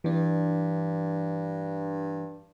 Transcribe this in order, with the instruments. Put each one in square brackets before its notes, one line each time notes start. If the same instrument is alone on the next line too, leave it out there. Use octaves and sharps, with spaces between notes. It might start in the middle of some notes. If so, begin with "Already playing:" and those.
[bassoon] G2 [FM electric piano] E3 D4